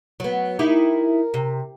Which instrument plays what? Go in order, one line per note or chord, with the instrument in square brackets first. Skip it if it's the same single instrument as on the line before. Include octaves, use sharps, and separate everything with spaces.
[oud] F#3 B3
[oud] D#4 E4 G4 [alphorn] A#4
[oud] C3